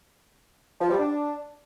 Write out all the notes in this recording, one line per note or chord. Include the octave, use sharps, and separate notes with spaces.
F3
G3
D4